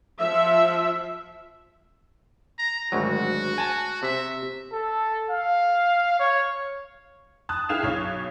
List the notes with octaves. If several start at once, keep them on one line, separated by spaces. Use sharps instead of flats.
F3 E5
A#5
G#1 D2 F#3 F#4
G#5 A5
C3 E5
A4
F5
C#5
A5 D#6 F#6
E4 G#4 F5 E7 F7
B1 C#5